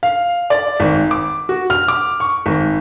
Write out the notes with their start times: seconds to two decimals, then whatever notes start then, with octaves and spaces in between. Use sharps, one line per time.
0.03 F5
0.50 D5
0.80 G#1
1.11 D6
1.49 F#4
1.70 F6
1.88 D6
2.20 C#6
2.46 G#1